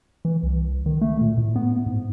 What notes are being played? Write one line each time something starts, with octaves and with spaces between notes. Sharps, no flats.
E3
C2
D#3
A3
A#2
A2
B3
G#2